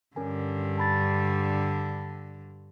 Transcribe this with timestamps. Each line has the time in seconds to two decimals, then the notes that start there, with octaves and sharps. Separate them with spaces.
0.16 G2 D3 C#4 A#4 G#5
0.78 A5 B5 A6